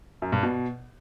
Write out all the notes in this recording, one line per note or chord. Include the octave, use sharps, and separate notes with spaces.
F#2
G2
B2